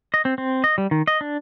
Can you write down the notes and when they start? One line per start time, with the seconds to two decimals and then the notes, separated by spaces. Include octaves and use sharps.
0.14 D#5
0.25 C4
0.38 C4
0.64 D#5
0.78 G3
0.91 D#3
1.07 D#5
1.21 D4